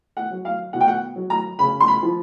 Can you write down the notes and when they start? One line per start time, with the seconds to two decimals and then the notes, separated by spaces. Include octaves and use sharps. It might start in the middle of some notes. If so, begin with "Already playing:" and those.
0.17 F#5
0.31 F#3
0.45 F5
0.73 B2 F#5
0.81 G5
0.88 F#5
1.16 F#3
1.30 A#5
1.59 C#3 B5
1.80 C6
1.88 B5
2.03 F3